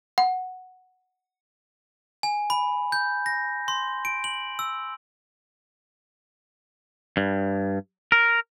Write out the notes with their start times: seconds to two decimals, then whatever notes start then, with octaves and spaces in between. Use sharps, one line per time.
0.18 F#5
2.23 G#5
2.50 B5
2.92 G6
3.26 A#6
3.68 C6
4.05 D7
4.24 F#7
4.59 E6
7.17 G2
8.12 A#4